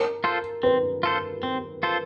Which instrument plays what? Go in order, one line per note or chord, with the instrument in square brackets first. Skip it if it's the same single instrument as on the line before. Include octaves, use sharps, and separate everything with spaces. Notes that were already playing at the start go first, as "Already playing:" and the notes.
Already playing: [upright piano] A#4
[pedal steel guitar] F4 A4 C5
[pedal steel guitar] C4 [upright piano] B4
[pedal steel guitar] F4 A4 C5
C4
F4 A4 C5